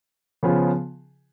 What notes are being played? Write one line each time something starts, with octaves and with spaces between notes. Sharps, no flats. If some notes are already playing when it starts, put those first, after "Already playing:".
C#3 F3 B3 F4 G#4